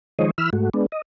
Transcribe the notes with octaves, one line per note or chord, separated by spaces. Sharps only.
D#3 F3 G#3 C5 C#5 D#5
E3 B5 E6 F6
G#2 A3 F#4
G#3 B3 D4
D#5